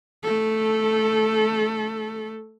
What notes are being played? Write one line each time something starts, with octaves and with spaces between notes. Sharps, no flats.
A3 A4